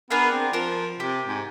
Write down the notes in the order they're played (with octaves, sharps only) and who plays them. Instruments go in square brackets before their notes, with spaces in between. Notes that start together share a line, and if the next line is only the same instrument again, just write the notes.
[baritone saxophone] B3 [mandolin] D4 G#4 A#4
[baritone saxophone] C4
[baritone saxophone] F3 [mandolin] A#4 C5
[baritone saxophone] C3 [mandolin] G4
[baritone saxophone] G#2